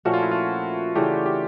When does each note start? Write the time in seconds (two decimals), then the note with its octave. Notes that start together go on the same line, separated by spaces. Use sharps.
0.05 A#2 F3 A3 C#4 F#4
0.14 F4
0.23 E4
0.31 F4
0.95 C#3 E3 A3 D4 G4
1.26 G4